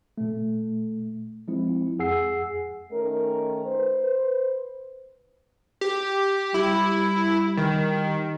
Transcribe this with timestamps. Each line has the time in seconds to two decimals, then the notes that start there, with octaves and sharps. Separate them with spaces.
0.18 A#2 A3
1.48 F3 G#3 C4 E4
1.99 F2 G#4 F#5 G#5 E6 C7
2.91 D#3 A3 C#4 A#4
3.66 B4 C5
5.81 G4
6.54 G3 E4
7.57 D#3